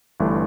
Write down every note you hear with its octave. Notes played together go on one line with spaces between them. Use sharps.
G1 G2 E3 A3